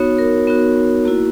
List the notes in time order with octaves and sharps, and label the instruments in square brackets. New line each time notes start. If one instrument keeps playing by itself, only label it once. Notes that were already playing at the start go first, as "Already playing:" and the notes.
Already playing: [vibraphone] B3 D#4 F#4 C#5
A#4
B3 D#4 F#4
A#3 E4 F#4